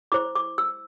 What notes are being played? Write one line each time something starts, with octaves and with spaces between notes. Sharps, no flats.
E4 C5 D6
D6
E6